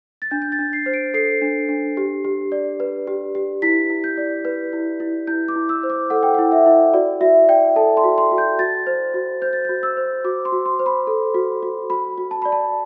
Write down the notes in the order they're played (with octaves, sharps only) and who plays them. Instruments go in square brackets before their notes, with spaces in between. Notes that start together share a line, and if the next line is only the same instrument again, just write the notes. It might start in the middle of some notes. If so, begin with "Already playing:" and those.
[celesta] A6
D4 G6
G6
A6
D4
C7
C5
D7
A4 C7
D4
D4
G4
G4
D5
B4
G4
G4
E4 B6
E4
G6
D5
B4
E4
E4
E4 G6
D6
E4
E6
C5
D6
A4 F#5
G5
E4 F#5
E5
E4
F#4 D5
F#4 E5
D5 G5
A4 A5
C6
F#4
C6
F#4
G6
F#4 A6
C5
F#4
C5 G6
A6
F#4 G6
E6
C5
F#4 D6
C6
F#4
C6
C5
B5
A4
F#4
F#4
F#4 B5
F#4
A5
D5 B5
A5